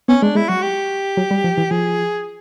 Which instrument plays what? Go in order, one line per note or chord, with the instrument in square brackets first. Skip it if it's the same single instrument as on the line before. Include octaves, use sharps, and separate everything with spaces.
[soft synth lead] B3 [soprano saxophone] C#4
[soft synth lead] G#3 [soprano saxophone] D4
[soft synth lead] G#3 [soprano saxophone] E4
[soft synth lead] F#3 [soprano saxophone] F#4
[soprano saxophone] G4
[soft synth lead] F#3
G3
F3
E3
[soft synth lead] F3 [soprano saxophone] G#4